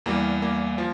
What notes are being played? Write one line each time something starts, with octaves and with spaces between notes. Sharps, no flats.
E2 E3 G3 A#3
A#3
F3